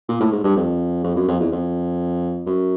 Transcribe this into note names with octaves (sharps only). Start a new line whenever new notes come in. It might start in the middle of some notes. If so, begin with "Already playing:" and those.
A#2
A2
G#2
G2
F2
F2
F#2
F2
E2
F2
F#2